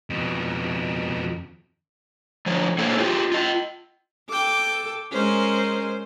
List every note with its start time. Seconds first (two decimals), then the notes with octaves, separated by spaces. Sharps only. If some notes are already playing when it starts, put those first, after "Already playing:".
0.10 F2 B2
2.46 F3 A3 C#5
2.78 A#3 A4 C5 C#5
2.98 F4 G4 G#4
3.32 F4 D#5
4.30 A4 G5 D6
5.12 G#3 C#4 A#4 C5